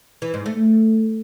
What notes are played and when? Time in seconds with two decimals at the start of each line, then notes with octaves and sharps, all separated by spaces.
0.22 E3
0.34 G#2
0.46 A3